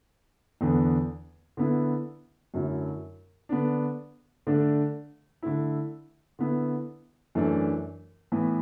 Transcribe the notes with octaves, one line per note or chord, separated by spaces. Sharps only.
E2 D3 B3
D3 B3 E4
F#2 D3 F#3 A3 E4
D3 B3 D4
D3 A3 D4
D3 A3 E4
D3 B3 E4
F#2 E3 A3 D4
A2 E3 B3